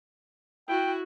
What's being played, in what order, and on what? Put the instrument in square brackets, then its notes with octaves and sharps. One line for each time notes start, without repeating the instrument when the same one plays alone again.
[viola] E4 F#4 [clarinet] G5